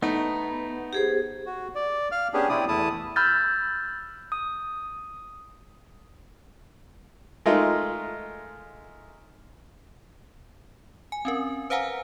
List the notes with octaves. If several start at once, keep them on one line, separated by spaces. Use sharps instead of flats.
A3 B3 D#4 A#5
G4 G#4 C5
F#4
D5
F5 F6
B3 C#4 D4 G4 G#4
C3 C4 E4 D5 D#6
E2 A3 E4 A5 D#6
B5 E6 F6 G6 A6
D#6
G#3 A3 D#4 F4 A#4
G#5
C4 C#4 A#4
B4 C5 F5 F#5 G#5 A#5